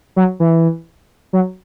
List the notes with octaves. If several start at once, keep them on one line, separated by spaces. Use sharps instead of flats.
F#3
E3
F#3